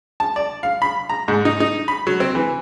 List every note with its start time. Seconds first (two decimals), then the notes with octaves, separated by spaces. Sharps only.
0.20 A5
0.36 D5
0.63 F5
0.82 B5
1.09 A#5
1.28 G#2
1.45 D#4
1.60 D#4
1.88 B5
2.07 F#3
2.20 C4
2.35 E3